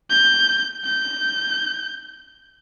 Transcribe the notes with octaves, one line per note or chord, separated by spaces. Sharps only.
G6
G6